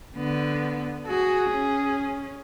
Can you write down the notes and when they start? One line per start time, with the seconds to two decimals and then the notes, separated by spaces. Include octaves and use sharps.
0.17 D3 B3
1.07 F#4 G#4
1.51 C#4